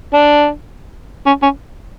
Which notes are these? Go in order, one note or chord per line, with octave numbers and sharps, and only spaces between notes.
D4
C#4
C#4